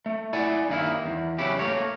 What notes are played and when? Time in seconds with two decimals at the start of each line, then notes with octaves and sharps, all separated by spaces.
0.06 A3
0.33 E4 D5 F#5 G#5
0.68 G2 D#3 A#3 E4
1.06 E2
1.38 C#3 F#3 E4 G4
1.59 A3 A#3 A#4 C#5